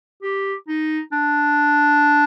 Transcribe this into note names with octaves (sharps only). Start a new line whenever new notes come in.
G4
D#4
D4